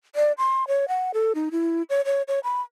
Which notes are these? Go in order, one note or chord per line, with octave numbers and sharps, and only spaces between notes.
D5
C6
C#5
F#5
A4
D#4
E4
C#5
C#5
C#5
B5